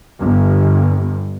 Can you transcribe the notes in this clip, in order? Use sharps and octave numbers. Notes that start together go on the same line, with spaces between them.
G1